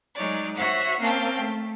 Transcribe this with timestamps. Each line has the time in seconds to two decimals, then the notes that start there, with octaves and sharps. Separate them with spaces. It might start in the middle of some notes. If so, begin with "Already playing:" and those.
0.15 F#3 G#3 D#4 C#5 D5
0.55 F#4 C5 C#5 E5 F#5
1.00 A#3 C4 C#4 F5 G5 A5
1.39 A3